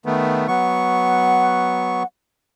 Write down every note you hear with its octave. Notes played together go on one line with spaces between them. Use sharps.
D#3 A3 B3
F#3 B3 F#5 C#6